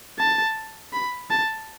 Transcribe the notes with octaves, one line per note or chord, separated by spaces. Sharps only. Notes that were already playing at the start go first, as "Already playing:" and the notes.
A5
B5
A5